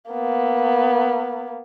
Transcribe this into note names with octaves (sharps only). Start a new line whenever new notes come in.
A#3 B3